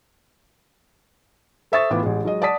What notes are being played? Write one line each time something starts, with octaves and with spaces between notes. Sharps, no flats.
A4 C5 E5 C#6 D#6 A6
A2 E3 B3 F4 D6
A1 G#3
F#3 G#3 D#5
D5 F#5 A5 D#6 B6